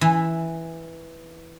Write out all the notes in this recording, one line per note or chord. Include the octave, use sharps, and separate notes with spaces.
E3